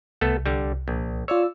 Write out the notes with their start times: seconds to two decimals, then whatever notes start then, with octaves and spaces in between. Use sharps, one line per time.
0.21 C2 A3 B3 A4
0.46 D3 G3
0.88 A#1
1.28 F4 C#5 D5 E6